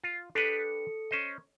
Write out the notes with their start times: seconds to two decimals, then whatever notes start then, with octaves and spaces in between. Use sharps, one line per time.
0.04 F4
0.35 D4 G4 A4 B4 C#7
1.11 C#4 C5 D#5